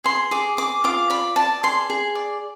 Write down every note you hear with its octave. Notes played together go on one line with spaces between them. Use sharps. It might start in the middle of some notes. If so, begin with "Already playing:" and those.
G#4 C6
G#4 D6
G#4 D6
F4 D6
D5 B5
D5 A5
G#4 C6
G#4
D5